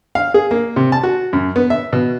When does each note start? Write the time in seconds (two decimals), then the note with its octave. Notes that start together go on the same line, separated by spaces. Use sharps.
0.15 F5
0.34 G#4
0.51 A#3
0.76 C3
0.92 A5
1.03 F#4
1.33 F#2
1.56 B3
1.70 E5
1.93 B2